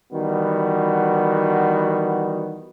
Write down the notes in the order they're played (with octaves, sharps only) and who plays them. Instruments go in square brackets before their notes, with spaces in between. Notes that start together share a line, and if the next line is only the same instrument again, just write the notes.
[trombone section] D#3 E3 G3 B3 F#4